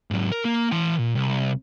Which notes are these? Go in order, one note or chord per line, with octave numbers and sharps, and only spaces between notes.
G#2 F#3
A#4
A#3
E3 C6
A#2
C2